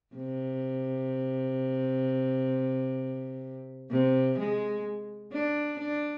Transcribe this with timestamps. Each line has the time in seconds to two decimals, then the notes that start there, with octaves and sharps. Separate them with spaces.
0.15 C3
3.91 C3
4.39 G#3
5.33 D4
5.79 D4